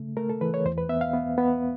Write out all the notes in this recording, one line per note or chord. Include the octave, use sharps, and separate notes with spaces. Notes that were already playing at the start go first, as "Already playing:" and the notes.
Already playing: C#3 A3
A3 A#4
A4
E3 B4
C#5
E2 C5
B4
B3 E5
F5
B3
B3